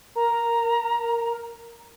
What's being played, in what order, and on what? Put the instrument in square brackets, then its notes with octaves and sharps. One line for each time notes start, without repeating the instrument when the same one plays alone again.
[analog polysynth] A#4 [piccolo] A#5